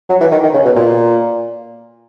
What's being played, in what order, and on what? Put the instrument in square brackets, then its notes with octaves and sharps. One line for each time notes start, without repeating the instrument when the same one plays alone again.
[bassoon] F#3
E3
D#3
D#3
C#3
B2
A#2